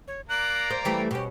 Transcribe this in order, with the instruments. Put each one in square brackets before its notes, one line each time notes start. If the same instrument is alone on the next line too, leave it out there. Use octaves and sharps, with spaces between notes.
[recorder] C#5
[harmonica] A#3 D5 A#5 [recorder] F#6
[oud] C5
[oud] E3 G3 A3 [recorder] G5
[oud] B2 C#4 [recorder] G4